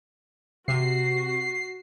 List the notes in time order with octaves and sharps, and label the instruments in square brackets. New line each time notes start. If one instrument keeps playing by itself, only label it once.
[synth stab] C3 [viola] F#4 [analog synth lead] C7